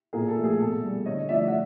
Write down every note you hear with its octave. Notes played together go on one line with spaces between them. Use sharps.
A#2 G#4 A#4
A4
F3 A3
G#4
B2 A4
G3
D3 C#5 D#5
F3 A3 D5 E5
F#5